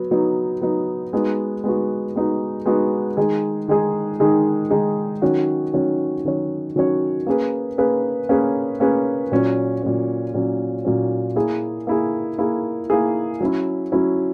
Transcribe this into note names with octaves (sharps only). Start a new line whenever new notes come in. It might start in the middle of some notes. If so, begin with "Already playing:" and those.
Already playing: F#3 B3
F#3 B3 D#4
F#3 B3 D#4
G#3 B3 D#4 F#4
G#3 B3 D#4 F#4
G#3 B3 D#4 F#4
G#3 B3 D#4 F#4
D#3 G#3 D#4 G#4
D#3 G#3 D#4 G#4
D#3 G#3 D#4 G#4
D#3 G#3 D#4 G#4
D#3 F#3 C#4 F#4 C#5
D#3 F#3 C#4 F#4 C#5
D#3 F#3 C#4 F#4 C#5
D#3 F#3 C#4 F#4 C#5
A#3 C#4 G#4 B4
A#3 C#4 G#4 B4
A#3 C#4 G#4 B4
A#3 C#4 G#4 B4
A#2 F#3 C#4
A#2 F#3 C#4
A#2 F#3 C#4
A#2 F#3 C#4
A#3 E4 G#4
A#3 E4 G#4
A#3 E4 G#4
A#3 E4 G#4
F#3 C#4 E4
F#3 C#4 E4